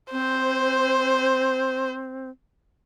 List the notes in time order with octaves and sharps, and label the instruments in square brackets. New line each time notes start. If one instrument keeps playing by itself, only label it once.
[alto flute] C4 [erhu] C5